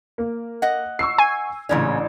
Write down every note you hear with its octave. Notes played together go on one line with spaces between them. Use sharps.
A#3
D#5 F#5
C#6 E6 C7
G#5
A1 A#2 C#3 C#4 D4